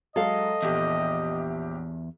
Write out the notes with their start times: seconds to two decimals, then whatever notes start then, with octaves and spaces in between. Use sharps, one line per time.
0.16 F#3 G#3 A4 D#5 F5
0.63 A#1 E2 G4 E5